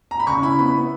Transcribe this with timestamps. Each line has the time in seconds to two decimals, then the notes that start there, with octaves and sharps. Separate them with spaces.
0.11 A#5
0.20 B5
0.27 C#3 C#6
0.42 E4 B5
0.59 B3 B5
0.74 B3